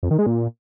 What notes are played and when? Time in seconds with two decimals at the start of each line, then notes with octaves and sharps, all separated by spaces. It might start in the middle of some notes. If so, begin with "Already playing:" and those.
0.03 F2
0.11 D#3
0.19 G#3
0.26 A#2